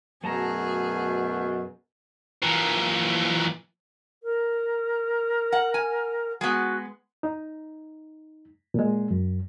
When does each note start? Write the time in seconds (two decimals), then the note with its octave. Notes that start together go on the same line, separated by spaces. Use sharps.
0.24 F#2 B2 A3 G#4 A5 A#5
2.42 A#2 E3
4.23 A#4
5.52 F#5
5.74 G#5
6.41 G#3 B3 F#4
7.23 D#4
8.74 A#2 G#3
9.11 F#2